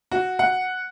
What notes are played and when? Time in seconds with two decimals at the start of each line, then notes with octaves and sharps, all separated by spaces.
0.11 F#4
0.39 F#5